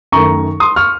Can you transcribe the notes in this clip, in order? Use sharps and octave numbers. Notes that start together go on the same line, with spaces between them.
F#2 D#3 A3 A#5 C#6
C6 D#6
C#6 F6